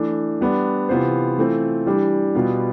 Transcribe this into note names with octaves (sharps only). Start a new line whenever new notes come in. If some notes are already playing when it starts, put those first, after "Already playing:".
Already playing: E3 A3 D4
G3 B3 D4
C3 E3 B3 F4 C5
E3 A3 C4 F4
E3 G3 D4 G4
B2 G3 B3 F4